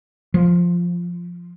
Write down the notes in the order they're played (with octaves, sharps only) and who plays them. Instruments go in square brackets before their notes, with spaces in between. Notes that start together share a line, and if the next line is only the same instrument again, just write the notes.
[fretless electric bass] F3